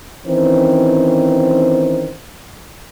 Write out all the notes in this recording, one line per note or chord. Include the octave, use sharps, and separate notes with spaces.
D#3 E3 C4 C#4 C5